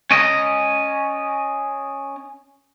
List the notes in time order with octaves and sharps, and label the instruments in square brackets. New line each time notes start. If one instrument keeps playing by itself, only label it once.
[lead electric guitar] C#4 D#5